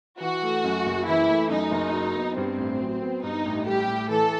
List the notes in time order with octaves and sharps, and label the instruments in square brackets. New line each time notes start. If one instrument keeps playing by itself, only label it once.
[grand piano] E3 [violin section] F#4
[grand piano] A3
F#2
F#1
[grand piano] E3 [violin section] E4
[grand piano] A3
[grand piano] F#2 [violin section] D#4
[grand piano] F#1
F#3
B3
[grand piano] G2 [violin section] C4
[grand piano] A1
F#3
B3
[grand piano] G2 [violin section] D#4
[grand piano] A1
[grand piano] G3 [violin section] G4
[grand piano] A2
[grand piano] E3 [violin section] A4